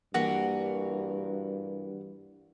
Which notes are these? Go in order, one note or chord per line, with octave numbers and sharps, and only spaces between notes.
G2 E3 A#3 F#4 A#4